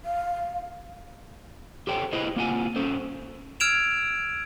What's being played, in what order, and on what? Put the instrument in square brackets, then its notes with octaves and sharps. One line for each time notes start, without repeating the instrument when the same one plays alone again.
[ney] F5
[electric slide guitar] G4 A4 C5 C#5 G5
E4 G#4 B4 C5 D#5
A#3 C4 F4 F#5 G#5
C#4 A4 C5
[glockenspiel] E6 F6 G#6 D7 E7 F7